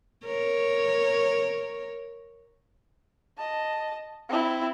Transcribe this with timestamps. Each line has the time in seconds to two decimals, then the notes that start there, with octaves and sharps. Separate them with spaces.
0.25 A#4 C#5
3.38 D#5 A5
4.29 C4 E4